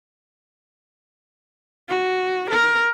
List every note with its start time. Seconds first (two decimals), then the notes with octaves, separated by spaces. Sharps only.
1.89 F#4
2.50 A#4